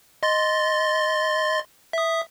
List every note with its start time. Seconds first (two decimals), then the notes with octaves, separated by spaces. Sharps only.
0.23 D#5 C6 A6
1.93 E5 D#6